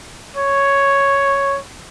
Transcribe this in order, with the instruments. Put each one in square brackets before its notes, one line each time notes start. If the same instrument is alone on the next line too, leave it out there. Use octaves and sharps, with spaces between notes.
[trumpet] C#5